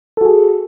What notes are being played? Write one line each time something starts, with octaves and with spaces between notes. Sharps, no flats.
F#4 G#4 A4